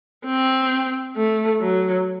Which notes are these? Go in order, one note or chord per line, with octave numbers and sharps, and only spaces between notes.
C4
A3
F#3